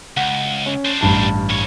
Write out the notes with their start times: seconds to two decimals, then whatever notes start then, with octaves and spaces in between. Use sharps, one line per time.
0.17 C#2 F#5
0.66 C#4
0.85 D4 C5
1.01 A1 G2 A5
1.49 C2 C#5